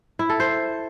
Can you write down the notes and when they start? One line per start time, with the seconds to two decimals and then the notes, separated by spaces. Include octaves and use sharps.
0.19 E4
0.30 A4
0.40 C5